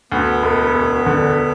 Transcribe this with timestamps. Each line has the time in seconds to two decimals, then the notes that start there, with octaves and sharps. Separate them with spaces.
0.12 D2 B3
0.43 E1
0.74 E1
1.06 D3